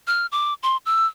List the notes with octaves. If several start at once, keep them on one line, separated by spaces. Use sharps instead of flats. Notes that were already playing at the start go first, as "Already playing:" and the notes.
F6
D6
C6
E6